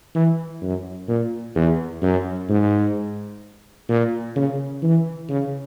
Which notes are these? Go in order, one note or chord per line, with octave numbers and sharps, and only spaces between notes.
E3
F#2
A#2
E2
F#2
G#2
A#2
C#3
E3
C#3